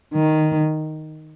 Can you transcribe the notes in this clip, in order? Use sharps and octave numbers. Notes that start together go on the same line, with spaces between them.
D#3